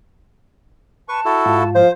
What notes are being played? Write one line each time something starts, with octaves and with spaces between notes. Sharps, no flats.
B4 A5 C#6
E4 F#4 A4
G#2 F4
F3 C5 F5